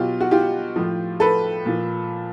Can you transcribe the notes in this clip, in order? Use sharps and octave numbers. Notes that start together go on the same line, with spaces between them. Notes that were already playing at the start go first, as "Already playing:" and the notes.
Already playing: B2 F#3 F4 G4
F#4
F4 G4
A2 F3
A4 B4
A#2 F3